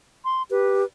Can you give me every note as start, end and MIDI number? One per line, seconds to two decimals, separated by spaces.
0.25 0.43 84
0.51 0.83 67
0.51 0.85 71